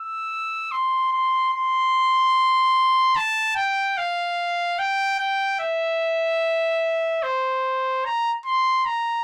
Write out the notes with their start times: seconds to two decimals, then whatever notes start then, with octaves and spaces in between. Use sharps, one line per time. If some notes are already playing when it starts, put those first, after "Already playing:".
Already playing: E6
0.72 C6
1.12 C6
1.53 C6
3.16 A5
3.56 G5
3.97 F5
4.79 G5
5.20 G5
5.60 E5
7.23 C5
8.05 A#5
8.46 C6
8.85 A#5